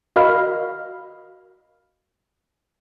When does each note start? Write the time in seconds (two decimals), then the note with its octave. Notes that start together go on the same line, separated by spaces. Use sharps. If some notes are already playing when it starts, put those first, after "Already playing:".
0.16 F#4 A#4 D#5 F5 B5 F6